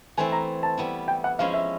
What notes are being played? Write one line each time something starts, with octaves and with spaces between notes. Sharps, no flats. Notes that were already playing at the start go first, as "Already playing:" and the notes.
E3 A3 C4 E4 G#5
A#5
A5
G3 B3 E4
G5
F#5
F3 G#3 C#4 E4 F5
E5